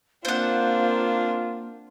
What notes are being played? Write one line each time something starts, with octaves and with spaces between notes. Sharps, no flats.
A#3 C4 D4 F4 C5 F#5